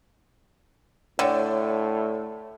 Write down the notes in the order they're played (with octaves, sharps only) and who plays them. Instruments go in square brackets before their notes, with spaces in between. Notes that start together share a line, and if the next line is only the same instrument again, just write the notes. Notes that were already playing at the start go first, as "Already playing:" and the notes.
[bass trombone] A2 [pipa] D3 [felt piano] C#5 D5 G5